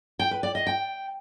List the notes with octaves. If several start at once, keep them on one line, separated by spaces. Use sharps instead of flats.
G5
B4
D5
D#5
G5